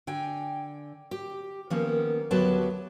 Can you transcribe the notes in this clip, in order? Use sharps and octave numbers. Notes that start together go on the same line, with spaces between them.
D3 G5 G#5
G4
D#3 F3 A#3 B3 C#4
D2 F#3 B3 G4 B4 A5